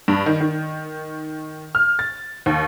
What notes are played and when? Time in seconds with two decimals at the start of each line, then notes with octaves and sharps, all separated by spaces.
0.08 G2
0.26 D#3
0.41 D#3
1.75 F6
1.99 A6
2.46 D#2